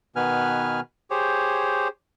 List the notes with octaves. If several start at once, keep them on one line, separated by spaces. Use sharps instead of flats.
B2 D#3 B3 B4 G#5 F6
G4 G#4 C5 C#5